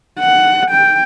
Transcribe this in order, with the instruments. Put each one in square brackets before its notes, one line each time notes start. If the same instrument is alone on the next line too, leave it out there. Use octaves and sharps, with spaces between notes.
[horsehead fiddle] F#5
G5